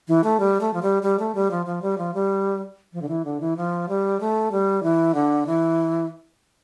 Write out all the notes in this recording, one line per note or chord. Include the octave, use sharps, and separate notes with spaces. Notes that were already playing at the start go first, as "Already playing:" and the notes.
E3
A3
G3
A3
F3
G3
G3
A3
G3
F3
F3
G3
F3
G3
F3
D3
E3
D3
E3
F3
G3
A3
G3
E3
D3
E3